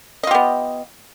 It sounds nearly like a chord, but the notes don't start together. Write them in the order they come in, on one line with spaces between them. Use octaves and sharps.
D#5 F4 G4 B3